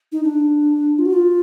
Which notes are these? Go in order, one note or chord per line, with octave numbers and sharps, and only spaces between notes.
D#4
D4
F4
F#4
F4